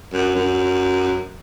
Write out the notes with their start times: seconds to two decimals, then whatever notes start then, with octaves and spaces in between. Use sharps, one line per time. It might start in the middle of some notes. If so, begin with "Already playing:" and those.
0.14 F#2
0.35 F#2